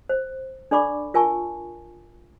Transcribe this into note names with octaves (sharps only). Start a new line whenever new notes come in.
C5
D4 A4 D5 B5 C#6 D6
F4 A#4 G#5 A5 C#6